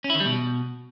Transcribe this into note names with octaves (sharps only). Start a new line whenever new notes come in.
C#4
E4
D#3
G3
B2